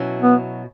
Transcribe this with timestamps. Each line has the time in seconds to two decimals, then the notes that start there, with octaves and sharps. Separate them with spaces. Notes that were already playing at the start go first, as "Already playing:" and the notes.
Already playing: B2 F#3 C#4 E4
0.22 B3